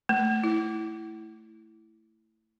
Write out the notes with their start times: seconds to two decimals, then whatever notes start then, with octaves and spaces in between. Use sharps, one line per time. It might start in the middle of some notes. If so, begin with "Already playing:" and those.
0.09 A3
0.44 E4